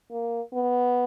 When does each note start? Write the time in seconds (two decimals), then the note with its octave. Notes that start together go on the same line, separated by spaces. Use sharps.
0.12 A#3
0.53 B3